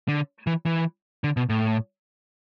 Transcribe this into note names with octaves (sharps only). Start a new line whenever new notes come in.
D3
E3
E3
D3
B2
A2